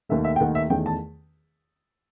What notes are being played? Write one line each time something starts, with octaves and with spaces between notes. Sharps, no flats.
D#2 D#3 A3 E5
E5
G5
D#2 D#3 A3 F#5
E5
E2 D#3 A3 G5
A5